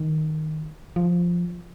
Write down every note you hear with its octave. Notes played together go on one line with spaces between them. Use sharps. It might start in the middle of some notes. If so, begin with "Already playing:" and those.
Already playing: D#3
F3